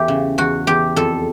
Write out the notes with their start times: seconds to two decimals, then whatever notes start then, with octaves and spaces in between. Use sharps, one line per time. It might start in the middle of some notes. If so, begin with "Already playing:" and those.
Already playing: E2 E3 G4 A4
0.08 C#3
0.38 E2 F#4
0.67 E2 G4
0.96 F2 A4